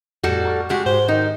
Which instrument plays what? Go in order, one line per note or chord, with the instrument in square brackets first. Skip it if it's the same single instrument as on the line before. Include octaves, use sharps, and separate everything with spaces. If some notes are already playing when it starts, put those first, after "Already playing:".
[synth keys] F2 A2 [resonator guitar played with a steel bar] G3 F#4 A4
[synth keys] A#5 C#6 F6
[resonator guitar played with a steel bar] G#3 G4 [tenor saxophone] F#4
[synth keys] G#2 [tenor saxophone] C5
[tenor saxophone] D#3 [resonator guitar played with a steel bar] D#4